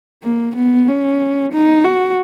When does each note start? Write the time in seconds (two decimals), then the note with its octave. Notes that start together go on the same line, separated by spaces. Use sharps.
0.23 A#3
0.56 B3
0.88 C#4
1.53 D#4
1.85 F#4